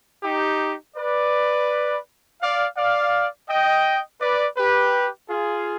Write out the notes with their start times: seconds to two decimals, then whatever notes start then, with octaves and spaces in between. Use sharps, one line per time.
0.23 D#4 G4
0.96 B4 D5
2.40 D5 F5
2.76 D5 F5
3.48 D#5 G5
4.20 B4 D5
4.56 G4 B4
5.28 F4 G#4